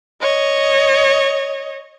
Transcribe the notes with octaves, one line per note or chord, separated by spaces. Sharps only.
C#5 D#5